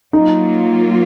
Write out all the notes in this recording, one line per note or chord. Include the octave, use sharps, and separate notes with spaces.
F#3 A#3 D#4 F4